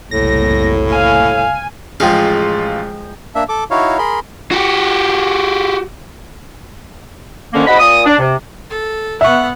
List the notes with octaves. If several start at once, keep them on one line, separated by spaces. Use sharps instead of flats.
F#1 C2 A2 A#3 A#6
F5 G#5
A1 F3 G#3 F4 G#4 F5 G5
A#3 D4 E5
A4 D6
D#4 E4 F#4 C#5 F5
G#4 A#4 B5 C6
F#4 G4
F2 D3 D#3 A#3 C#4
G#2 F#4 D#5 B5
A#2 D#6
D4
C3
A4
B3 E5 F#5 C#6